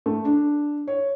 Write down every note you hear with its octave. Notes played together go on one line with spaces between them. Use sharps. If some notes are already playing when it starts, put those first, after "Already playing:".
A3
D4
C#5